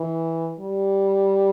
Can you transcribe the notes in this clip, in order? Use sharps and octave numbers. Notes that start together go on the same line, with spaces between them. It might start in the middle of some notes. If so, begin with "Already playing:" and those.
Already playing: E3
G3